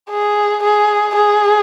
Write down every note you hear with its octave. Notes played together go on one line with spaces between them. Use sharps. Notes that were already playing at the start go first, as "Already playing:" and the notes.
G#4
G#4
G#4